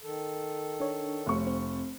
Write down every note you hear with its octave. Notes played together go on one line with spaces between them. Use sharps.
D#3 A4
D4 C#5
F1 C#6
C4